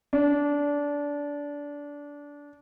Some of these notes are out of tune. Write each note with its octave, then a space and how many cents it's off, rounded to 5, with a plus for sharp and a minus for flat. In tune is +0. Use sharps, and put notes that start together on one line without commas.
D4 -20